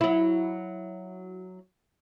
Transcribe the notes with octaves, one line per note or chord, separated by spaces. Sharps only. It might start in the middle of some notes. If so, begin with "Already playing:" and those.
F#3 E4